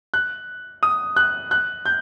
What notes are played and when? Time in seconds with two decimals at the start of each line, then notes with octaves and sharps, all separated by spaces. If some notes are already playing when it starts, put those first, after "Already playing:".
0.14 F#6
0.83 D#6
1.16 F#6
1.51 F#6
1.86 G6